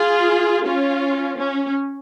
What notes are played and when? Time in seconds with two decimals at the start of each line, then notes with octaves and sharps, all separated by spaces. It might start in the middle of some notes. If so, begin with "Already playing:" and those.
Already playing: F4 G#4
0.65 C#4 F4
1.37 C#4